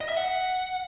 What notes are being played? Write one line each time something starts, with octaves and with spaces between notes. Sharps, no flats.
D#5
E5
F#5